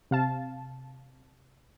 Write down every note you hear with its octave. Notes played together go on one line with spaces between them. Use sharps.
C3 F5 A5